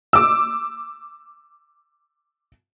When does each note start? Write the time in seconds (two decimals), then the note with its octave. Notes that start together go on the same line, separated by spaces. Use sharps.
0.13 D6 E6